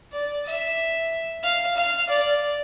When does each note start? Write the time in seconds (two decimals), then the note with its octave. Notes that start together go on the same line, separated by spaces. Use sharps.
0.13 D5
0.46 E5
1.43 F5
1.77 F5
2.09 D5